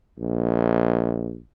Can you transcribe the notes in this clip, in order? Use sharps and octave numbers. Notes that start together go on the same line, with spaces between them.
A#1